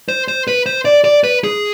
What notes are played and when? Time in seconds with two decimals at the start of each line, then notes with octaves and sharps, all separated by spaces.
0.08 C5
0.28 C5
0.47 B4
0.66 C5
0.85 D5
1.04 D5
1.24 B4
1.44 G#4